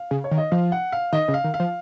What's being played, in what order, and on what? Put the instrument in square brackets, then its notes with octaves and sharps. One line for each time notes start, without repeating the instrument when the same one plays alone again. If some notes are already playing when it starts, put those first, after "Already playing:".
Already playing: [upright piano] F5
[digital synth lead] C#3
[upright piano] C#5
[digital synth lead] D#3
[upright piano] D#5
[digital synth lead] F3 [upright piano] F5
[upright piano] F#5
F5
[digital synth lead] D#3 [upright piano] D#5
[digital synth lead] C#3
[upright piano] F5
[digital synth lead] D#3
[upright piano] F5
[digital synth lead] F3